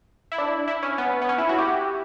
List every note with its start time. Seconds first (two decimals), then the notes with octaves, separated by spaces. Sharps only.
0.32 E4
0.38 D4
0.68 E4
0.83 C#4
0.98 B3
1.22 B3
1.29 C#4
1.38 E4
1.49 F#4
1.58 G4